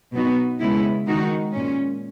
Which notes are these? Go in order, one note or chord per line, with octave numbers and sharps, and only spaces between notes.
B2 F#3 B3 D#4 F#4
C#3 G#3 B3 E4
D#3 G#3 D#4 F#4
A#2 G#3 C#4